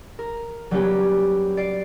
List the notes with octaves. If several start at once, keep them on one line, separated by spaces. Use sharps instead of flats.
A#4
F#3 G3 A#3 B3 C#4 G4
D5 C7 D7